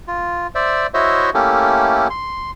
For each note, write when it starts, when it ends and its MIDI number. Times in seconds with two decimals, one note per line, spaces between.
0.08 0.47 65
0.55 0.87 72
0.55 0.87 74
0.55 0.87 76
0.94 1.30 64
0.94 1.30 66
0.94 1.30 72
0.94 1.30 73
0.94 1.30 75
0.94 1.30 76
1.34 2.08 57
1.34 2.08 58
1.34 2.08 61
1.34 2.08 64
1.34 2.08 67
1.34 2.08 69
2.10 2.51 84